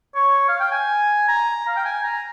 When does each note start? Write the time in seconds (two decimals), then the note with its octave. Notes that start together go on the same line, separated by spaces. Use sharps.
0.15 C#5
0.49 F5
0.60 G5
0.72 G#5
1.29 A#5
1.68 F5
1.76 G5
1.85 G#5
2.03 A#5